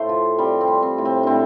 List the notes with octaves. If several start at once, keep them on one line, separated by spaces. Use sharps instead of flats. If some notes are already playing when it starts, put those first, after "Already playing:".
Already playing: A2 A3 C5 F5
F3
G3 C4
C4
G3
C4
A2
C4
A2 C4 D4